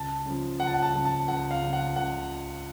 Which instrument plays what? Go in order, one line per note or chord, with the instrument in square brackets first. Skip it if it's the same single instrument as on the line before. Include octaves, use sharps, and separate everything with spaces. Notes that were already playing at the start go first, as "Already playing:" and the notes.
Already playing: [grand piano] C#2 A5
C#3 F3
C#2 F#5
A5
F#5
A5
C#3 F3
A5
C#2 F#5
F5
C#3 F3
F#5
C#2 F#5